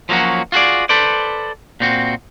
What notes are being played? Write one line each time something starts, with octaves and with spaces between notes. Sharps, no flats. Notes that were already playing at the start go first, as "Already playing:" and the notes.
F3 F#3 A#3 C#4 F#4
F4 F#4 G#4 D5
A4 B4 C5 D5
A#2 C4 F#4